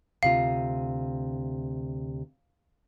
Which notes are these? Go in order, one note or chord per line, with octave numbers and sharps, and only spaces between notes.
D2 C3 F4 F5